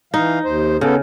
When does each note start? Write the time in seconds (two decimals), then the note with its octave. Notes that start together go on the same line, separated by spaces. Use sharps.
0.14 E3 D#4 F5
0.45 D#2 C5
0.81 C#3 B3 C#4 A4